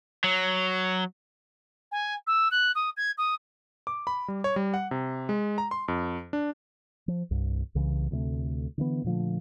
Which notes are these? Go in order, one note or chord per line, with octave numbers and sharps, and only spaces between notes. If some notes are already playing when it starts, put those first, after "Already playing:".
F#3
G#5
E6
F#6
D#6
G#6
D#6
D6
B5
G3
C#5
G3
F#5
C3
G#3
A#5
C6
F2
D4
F3
C2 G2
C2 C#3 E3
D2 C3 G#3 A3
D3 E3 B3
A#2 D3 F3 A3